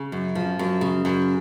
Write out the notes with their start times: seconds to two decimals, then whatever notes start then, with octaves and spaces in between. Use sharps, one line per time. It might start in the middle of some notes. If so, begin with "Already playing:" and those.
Already playing: C#3
0.12 F#2
0.35 F3
0.59 F#2
0.81 C#3
1.05 F#2